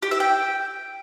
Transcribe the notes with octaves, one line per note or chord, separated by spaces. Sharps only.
G4
E5
G5